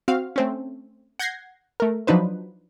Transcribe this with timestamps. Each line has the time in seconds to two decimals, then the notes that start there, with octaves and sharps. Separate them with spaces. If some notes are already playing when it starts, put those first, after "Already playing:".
0.08 C4 F#4 F5
0.36 A3 C4 C#4
1.19 F#5 G6 G#6 A#6 C7
1.80 A3 A#4
2.07 F3 F#3 D4 D#4 B4 C5